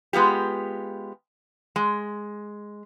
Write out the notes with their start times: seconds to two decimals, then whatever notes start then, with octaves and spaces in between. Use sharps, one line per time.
0.13 G#3 B3 F4 G4
1.76 G#3